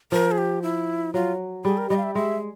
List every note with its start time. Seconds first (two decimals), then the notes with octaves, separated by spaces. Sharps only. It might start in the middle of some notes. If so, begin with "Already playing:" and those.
0.12 F3 A#4
0.31 G#4
0.38 G4
0.62 E4
1.14 F#3 F4
1.65 G3 G#4
1.78 A#4
1.90 G3 D#5
1.97 F5
2.03 E5
2.15 G#3 E5